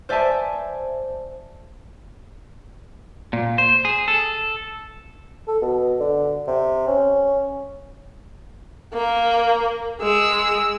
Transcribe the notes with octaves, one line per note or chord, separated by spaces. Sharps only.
C5 D5 E5 G#5 A5
A#2
C5
G#4
A4
A4
B2
D3
C3
C#4
A#3 A#4
G#3 E6